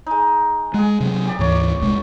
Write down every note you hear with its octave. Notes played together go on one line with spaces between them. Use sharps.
G#3 D#4
G#3 G#4 F#5
C3 F#3
G4 D5
D2 G#2 E3 C#5 D5
D#1 C2 G#3